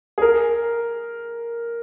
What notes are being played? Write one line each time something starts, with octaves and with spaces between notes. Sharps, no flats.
G#4
A#4